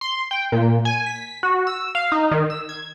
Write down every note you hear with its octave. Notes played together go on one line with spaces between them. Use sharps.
C6
G5
A#2
G#5
B6
F#4
E6
F5
D#4
D#3
E6
G#6